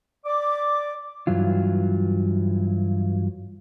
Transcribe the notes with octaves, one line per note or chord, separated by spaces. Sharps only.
D5 D6
G2 E3 F#3 F4